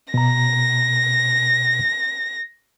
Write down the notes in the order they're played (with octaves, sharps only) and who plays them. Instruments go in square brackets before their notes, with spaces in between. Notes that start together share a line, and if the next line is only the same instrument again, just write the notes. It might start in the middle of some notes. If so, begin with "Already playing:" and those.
[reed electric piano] B2 A#5 [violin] A#6